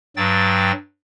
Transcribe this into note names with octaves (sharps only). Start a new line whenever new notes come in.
G2 F#3 G5 A6